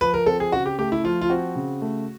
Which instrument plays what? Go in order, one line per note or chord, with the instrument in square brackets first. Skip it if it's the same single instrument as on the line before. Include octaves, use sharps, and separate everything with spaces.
[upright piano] F3 [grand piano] B4
[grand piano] A#4
[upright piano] C4 [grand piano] A4
[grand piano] G#4
[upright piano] C#3 [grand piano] F#4
[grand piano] G4
[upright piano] A3 [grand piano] G4
[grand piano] E4
[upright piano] F3 [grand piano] F4
[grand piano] F4
[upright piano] C4 [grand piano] F#4
[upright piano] C#3
A3